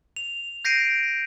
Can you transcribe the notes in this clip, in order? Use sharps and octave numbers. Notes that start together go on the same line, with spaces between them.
F7
G6 A#6 C7 D7 D#7